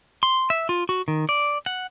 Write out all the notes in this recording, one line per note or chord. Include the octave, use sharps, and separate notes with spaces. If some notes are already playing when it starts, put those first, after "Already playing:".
C6
E5
F4
F#4
D#3
D5
F#5